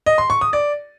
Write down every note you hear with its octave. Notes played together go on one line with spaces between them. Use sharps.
D#5
C6
C#6
D#6
D5